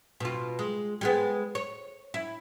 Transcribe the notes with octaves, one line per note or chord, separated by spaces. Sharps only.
B2 F4
G#3
G3 G#3 B3
C#5
E4